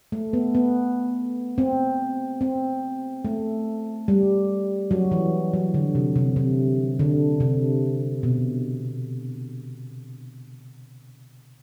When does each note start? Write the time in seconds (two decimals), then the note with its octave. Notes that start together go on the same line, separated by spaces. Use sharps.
0.12 A3
0.33 B3
0.55 B3
1.58 C4
2.41 C4
3.25 A3
4.08 G3
4.91 F#3
5.11 E3
5.54 F#3
5.74 D3
5.95 C3
6.16 C3
6.36 C3
6.99 D3
7.40 C3
8.23 B2